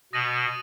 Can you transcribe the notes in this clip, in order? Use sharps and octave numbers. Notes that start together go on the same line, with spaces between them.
B2 D#6 A#6 D#7 F#7